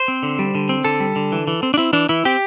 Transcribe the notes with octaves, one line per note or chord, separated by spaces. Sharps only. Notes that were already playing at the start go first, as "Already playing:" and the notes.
Already playing: C5
C4
D3
G3
D3
C4
D3 A4
G3
D3
E3
E3
C4
D4
C4 E4
E3 D4
E3 E4
C4 G4